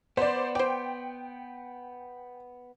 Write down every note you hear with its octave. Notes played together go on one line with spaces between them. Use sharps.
B3 C5 D5
C5 D5 G5